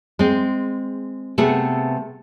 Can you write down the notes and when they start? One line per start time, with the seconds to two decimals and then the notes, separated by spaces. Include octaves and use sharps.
0.19 G#3 C4
1.38 C3 A3 B3 G#4 F#5